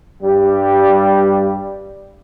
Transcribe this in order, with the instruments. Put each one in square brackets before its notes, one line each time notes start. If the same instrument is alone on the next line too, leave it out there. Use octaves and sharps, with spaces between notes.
[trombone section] G2 G3